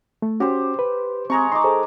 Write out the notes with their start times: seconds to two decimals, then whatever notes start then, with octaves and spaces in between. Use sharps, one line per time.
0.22 A3
0.40 C#4 F#4 G4 C5
0.79 B4
1.30 G#3 C4 A#5 C#6
1.52 D#4 C6 D6
1.64 G#4 A4 C5